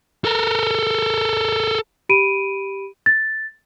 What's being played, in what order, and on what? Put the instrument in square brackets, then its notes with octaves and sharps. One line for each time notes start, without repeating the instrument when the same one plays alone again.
[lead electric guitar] A4 A#4
[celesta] G4 B5 D7 D#7
A6